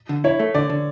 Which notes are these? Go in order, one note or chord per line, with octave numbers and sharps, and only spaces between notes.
D3
E4 C#5
A3
D3 D5
D3